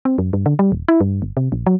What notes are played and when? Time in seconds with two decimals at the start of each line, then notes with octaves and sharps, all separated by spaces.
0.05 C4
0.18 F#2
0.33 G2
0.46 D3
0.59 G3
0.72 D#1
0.88 E4
1.01 G2
1.22 G1
1.37 C3
1.52 A#1
1.66 F#3